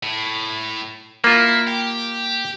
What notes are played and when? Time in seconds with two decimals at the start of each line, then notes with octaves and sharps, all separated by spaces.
0.03 A2
1.24 A#3 E4 F4
1.67 G4